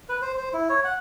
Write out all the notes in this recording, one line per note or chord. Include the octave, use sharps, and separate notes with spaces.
B4
C5
C5
E4
C#5
F#5